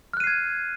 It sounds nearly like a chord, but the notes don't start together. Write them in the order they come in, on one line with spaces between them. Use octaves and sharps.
F6 F#6 D#7 C7 G#6